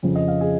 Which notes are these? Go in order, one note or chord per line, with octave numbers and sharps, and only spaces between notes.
F2 C#3 F3
D#5
F5
G#4